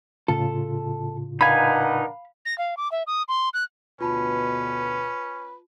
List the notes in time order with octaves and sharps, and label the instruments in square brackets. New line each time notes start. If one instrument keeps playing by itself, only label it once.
[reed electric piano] A2 C#3 F4 [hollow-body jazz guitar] A4
[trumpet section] D4 A#4 F#5 [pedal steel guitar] D#4 B4 G#5 [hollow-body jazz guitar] F5 B5
[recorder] A#6
F5
D6
E5
D#6
C6
F#6
[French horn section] D2 B2 [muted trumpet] C#4 [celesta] F4 A5 B5 [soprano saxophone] B4